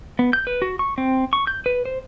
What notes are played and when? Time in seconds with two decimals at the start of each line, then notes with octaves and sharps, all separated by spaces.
0.19 B3
0.33 G6
0.47 B4
0.62 F#4
0.79 C#6
0.98 C4
1.33 C#6
1.47 G6
1.66 B4
1.85 C5